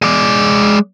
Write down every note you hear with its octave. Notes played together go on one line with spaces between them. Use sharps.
G#3 D5